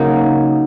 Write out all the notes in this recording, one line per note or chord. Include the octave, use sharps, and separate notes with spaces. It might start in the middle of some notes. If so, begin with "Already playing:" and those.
Already playing: C#3 F#3 A#3 D#4